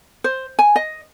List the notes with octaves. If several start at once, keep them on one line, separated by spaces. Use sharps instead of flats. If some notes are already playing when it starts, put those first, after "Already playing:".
C5
G#5
D#5